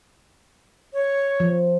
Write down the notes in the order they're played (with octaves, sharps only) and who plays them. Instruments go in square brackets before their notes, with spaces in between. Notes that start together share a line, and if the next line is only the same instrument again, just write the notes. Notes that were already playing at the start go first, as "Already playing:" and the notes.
[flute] C#5
[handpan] F3